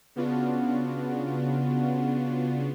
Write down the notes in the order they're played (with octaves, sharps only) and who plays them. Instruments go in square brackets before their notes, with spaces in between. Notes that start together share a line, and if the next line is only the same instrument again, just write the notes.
[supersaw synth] C#3 B3 D4 F4 F#4